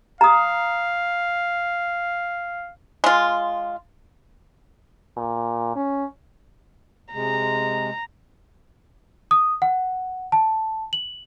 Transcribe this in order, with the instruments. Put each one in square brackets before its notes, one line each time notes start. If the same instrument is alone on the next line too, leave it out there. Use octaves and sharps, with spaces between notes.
[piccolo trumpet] F5 [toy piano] A#5 D#6
[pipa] G#3 F4
[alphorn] A#2
C#4
[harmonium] C3 G#3 [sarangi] A#5
[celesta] D#6
F#5
A5
F#7